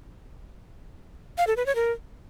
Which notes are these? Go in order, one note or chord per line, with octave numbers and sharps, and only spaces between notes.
F5
A4
B4
C#5
A#4